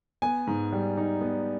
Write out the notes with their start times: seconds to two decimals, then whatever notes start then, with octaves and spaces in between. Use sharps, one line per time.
0.22 B3 G#5
0.47 G#2
0.73 G3
0.97 D#4
1.21 B3